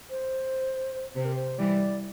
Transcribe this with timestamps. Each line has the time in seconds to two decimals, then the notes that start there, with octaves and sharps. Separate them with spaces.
0.10 C5
1.16 C3 C5
1.25 A#4
1.35 C5
1.58 E3 G3 D5